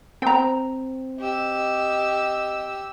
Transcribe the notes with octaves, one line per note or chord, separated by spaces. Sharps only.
C4 G5 A#5
G4 D#5 E6